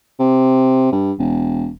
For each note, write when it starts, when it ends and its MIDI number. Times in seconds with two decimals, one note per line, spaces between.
0.19 0.89 48
0.92 1.12 43
1.19 1.70 28